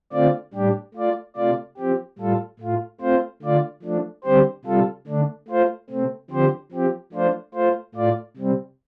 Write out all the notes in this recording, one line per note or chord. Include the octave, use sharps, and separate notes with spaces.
D3 A3 C4 F4 D5
A2 G3 D4 G4
A3 F4 D5
C3 A3 F4 D5
F3 C4 G4
A2 G3 F4 A4
A2 A3 F4
A3 C4 F4 C5
D3 A3 F4 D5
F3 A3 D4
D3 G3 C4 G4 C5
C3 G3 F4 A4
D3 A3 D4
A3 F4 C5
C3 A3 C4
D3 F3 C4 G4 C5
F3 C4 G4
F3 A3 D4 F4 C5
A3 F4 C5
A2 A3 F4 D5
C3 G3 C4